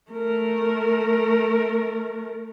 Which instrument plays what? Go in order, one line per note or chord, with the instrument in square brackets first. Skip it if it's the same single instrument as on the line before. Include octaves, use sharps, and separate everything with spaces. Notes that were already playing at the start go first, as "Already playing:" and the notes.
[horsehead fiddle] A3 A#4